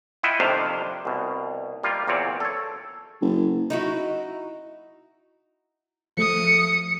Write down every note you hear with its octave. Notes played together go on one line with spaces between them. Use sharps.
E4 F4 D#5 E5 F#5 G5
F2 C3 D#3 D4 C5 F5
C2 B2
G3 A#3 F4
E2 A#2 C4 C#5 D5
A4 C#5
F#1
D#4 E4 F#4
F3 A3 D#6 C#7